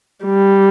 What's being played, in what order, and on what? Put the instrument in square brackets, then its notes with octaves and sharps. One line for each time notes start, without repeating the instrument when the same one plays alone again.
[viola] G3